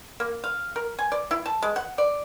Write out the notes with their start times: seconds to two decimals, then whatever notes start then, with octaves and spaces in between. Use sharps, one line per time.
0.20 A#3
0.44 F5
0.76 A#4
0.99 G#5
1.12 D5
1.31 E4
1.46 A5
1.63 G#3
1.76 F#5
1.98 D5